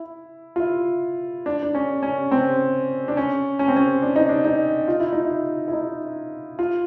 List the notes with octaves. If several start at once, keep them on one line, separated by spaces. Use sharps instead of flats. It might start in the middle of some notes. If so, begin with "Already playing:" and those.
Already playing: E4
F4
E4
D4
D4
C#4
C#4
C4
D4
C#4
C#4
C4
C#4
D4
D#4
D4
D#4
F4
E4
D#4
E4
E4
D#4
F4